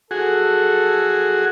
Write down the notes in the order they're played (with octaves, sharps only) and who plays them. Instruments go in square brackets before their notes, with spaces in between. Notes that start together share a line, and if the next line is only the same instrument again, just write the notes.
[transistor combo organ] F#4 G#4 [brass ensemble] A4